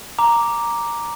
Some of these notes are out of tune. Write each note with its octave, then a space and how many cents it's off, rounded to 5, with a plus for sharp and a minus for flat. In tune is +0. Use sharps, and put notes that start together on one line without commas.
A#5 +0 D6 +0